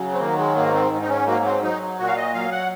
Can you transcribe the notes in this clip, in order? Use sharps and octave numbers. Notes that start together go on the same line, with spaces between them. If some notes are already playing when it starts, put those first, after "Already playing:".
Already playing: C#3 F#3
C4
D#3 A#3
G#3
G#2 A#3
C4
G#2
D#4
C#4
F#3 A#3
C4
F#3 D#4
A#2 F#4
F5
D#5
F#3 F5
F#5